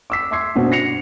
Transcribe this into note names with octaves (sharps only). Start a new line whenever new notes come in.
D6 E6 B6
E5 C6 D6 E6 G#6 C7
G2 B2 C4 C#4
A#6 C7 C#7 F7